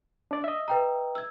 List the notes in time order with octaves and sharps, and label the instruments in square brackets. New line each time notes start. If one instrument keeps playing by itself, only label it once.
[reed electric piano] D4 D5
D#5 E5
[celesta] B4 G5 A#5
E6 G#6